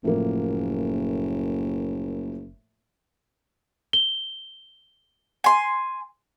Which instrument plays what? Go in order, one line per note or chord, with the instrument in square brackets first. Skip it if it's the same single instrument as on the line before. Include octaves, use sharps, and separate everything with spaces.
[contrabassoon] F#1 [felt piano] A2 F3 A#3
[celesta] G7
[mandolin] G#5 C6